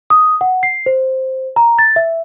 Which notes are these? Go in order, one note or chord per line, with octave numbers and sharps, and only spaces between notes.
D#6
F#5
C7
C5
A#5
A6
E5